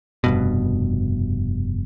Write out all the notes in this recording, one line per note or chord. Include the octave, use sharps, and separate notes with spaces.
F1 G2 B2